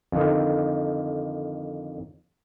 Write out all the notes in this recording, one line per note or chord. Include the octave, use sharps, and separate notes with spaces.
F2 D3 D#3